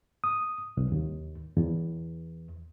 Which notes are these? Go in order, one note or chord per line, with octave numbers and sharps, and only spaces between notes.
D#6
C2
D#2
E2